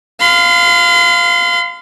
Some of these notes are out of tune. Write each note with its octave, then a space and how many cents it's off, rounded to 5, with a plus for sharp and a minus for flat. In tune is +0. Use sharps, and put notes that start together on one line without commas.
F5 +0 C6 -45